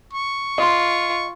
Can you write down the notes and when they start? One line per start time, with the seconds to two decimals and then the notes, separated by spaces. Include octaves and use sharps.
0.13 C#6
0.58 F4 D#5 C6